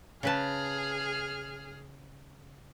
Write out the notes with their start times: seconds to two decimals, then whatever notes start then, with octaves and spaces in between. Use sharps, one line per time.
0.23 C#3 G#4 B4 A5 F6